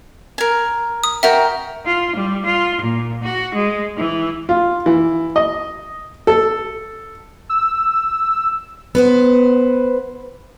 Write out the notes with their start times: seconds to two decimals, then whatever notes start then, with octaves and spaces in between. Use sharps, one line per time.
0.38 A#4 G#5
1.04 D#6
1.23 F#4 A#4 E5 G5
1.86 F4
2.15 G3
2.46 F4
2.81 A#2
3.23 F#4
3.54 G#3
3.95 E3
4.49 F4
4.86 E3
5.36 D#5
6.27 A4
7.49 E6
8.95 B3 B4 C5